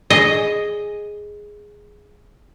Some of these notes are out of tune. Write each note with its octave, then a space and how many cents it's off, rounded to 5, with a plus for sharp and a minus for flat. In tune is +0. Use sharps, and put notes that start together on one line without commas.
G#4 +0 D#5 +0